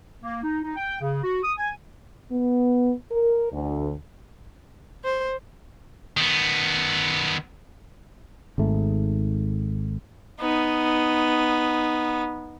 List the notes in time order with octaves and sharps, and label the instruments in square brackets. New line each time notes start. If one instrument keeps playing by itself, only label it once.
[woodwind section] A#3
D#4
D#4
G5
C#3
F#4
D#6
G#5
[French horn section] B3
A#4
D2
[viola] C5
[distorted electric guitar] D#3 B3
[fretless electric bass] G#1 G#2 A3
[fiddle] B3 D#4